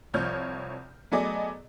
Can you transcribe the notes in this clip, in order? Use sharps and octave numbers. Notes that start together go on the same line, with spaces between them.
C2 F3 C#5 F6 G6
F#3 A3 B3 G#4 D5 D#5